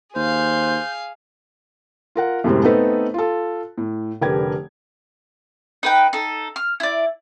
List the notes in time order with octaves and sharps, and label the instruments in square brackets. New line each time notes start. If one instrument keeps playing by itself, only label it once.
[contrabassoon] D#2 [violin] G#4 F5 [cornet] C5 [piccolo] G6
[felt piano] F4 A#4 F#5
F#2 A2 C3 G3 G#3 C4
A3 B3 C4 D#4 A4 B4
F4 A4
A2
F1 D3 G4 A#4 B4 G#6
[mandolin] D#4 B4 G5
D#4 A4
F6
E4 D5